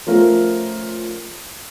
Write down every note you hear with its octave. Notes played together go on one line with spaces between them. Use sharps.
F3 A3 C#4 F4 A#4